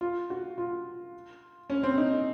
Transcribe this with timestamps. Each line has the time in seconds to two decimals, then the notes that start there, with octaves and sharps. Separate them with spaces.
0.01 F4
0.30 F#4
0.58 F4
1.70 C#4
1.83 C4
1.98 D#4
2.12 D#4